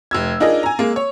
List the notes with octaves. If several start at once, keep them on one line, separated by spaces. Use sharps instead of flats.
F1 E6 G#6
D4 D#4 F4 G#4 A#4 D#5
G#5 A#5
G#3 A#3
C#5